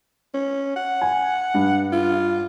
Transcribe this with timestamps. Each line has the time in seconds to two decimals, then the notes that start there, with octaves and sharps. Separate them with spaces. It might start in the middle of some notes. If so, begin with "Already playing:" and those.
0.34 C#4
0.76 F#5
1.02 G#5
1.54 G2
1.92 F4